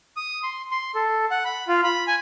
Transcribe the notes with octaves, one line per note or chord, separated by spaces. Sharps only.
D#6
C6
C6
A4
F#5
B5
F4
B5
G#5